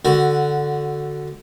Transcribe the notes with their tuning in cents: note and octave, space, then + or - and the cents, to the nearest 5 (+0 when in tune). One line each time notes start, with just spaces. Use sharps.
D3 +0 F#4 +0